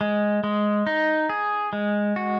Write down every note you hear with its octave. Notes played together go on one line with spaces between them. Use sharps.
G#3
G#3
D#4
G#4
G#3
F#4